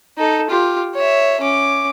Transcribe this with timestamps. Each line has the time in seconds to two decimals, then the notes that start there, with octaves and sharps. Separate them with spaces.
0.18 D#4 A4
0.50 F4 G4
0.95 C#5 E5
1.41 C#4 D6